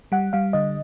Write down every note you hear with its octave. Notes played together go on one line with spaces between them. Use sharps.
G3 F#5
G3 F5
D3 D#5